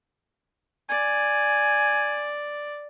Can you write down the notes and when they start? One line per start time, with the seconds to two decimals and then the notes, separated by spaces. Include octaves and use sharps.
0.90 D5 G#5